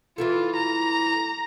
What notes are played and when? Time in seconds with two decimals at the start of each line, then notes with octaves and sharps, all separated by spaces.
0.18 E3 E4 F4 A4
0.56 A#5